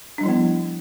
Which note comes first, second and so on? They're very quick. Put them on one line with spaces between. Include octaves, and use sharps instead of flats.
D4 G3 E4 F3 B3